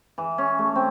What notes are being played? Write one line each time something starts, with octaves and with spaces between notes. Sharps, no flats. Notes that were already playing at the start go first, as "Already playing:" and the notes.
E3
C#4
A3
C4